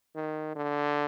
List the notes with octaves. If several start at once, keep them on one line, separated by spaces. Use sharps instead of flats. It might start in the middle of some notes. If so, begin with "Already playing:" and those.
D#3
D3